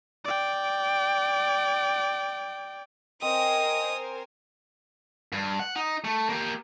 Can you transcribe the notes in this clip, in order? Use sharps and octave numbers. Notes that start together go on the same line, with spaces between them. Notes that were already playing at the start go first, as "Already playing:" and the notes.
D5 G5
C4 A#4 C5 D#5 G#5 D#6
G2
F#5
D#4
A3
A#3 G4